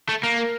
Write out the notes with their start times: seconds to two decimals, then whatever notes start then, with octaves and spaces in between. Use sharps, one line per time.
0.09 A3
0.23 A#3
0.38 A#4